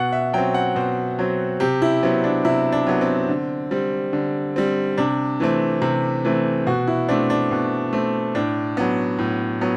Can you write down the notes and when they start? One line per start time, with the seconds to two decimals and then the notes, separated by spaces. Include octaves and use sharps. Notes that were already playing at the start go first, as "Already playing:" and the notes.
Already playing: B2 F#5
0.12 E5
0.33 F#3 C4 G5
0.54 F#5
0.76 B2 C5
1.19 F#3 C4
1.60 C3 G4
1.82 E4
2.03 F#3 B3 C4
2.24 D4
2.45 C3 E4
2.72 D4
2.87 F#3 B3
3.01 C4
3.29 D3
3.71 G3 C4
4.13 D3
4.56 G3 C4
4.98 C3 D4
5.40 E3 A3 C4
5.82 C3
6.25 E3 A3 C4
6.66 B2 F#4
6.87 E4
7.09 A3 C4 D4
7.30 D4
7.51 B2
7.93 A3 C4
8.35 A2 D4
8.77 F#3 B3
9.19 A2
9.61 F#3 B3